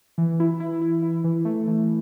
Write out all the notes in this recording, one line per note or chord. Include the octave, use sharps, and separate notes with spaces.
E3
E4
E4
E4
E4
E3
A3
E3